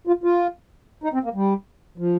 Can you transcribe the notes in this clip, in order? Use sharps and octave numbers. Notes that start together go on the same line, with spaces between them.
F4
F4
D#4
C4
A#3
G3
F3